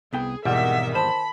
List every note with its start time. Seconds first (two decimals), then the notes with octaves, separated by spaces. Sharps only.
0.13 C2 B3 G#4 G5
0.45 G#1 E2 B2 D#3 G3 E5 F#5
0.95 C5 A5 B5